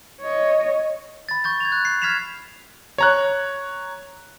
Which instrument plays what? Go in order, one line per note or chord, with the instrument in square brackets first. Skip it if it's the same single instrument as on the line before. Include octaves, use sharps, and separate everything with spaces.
[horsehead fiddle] C#5 D#5
[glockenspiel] B5 A6
C#6 G6 A6
G#6 F7
F#6
C7
F6 G#6 B6 C7 E7 F7
[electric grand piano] C#5 A#5 F#6